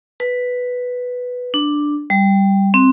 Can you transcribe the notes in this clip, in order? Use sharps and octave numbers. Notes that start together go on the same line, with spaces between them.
B4
D4
G3
C4